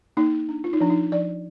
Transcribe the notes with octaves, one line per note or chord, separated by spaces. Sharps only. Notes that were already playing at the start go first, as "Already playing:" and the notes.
A#3 D#4
D4
F4
D#4
F3 D4
D#4
F3 D5